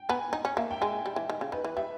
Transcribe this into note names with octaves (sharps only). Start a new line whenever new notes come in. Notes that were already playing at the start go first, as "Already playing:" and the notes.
Already playing: G5
B3 G#5
D#4 G#5
C#4
A#3 E5
G5
G#3 G#5
G3
E3
D#3
C#3
D#3 B4
E3
G3 E5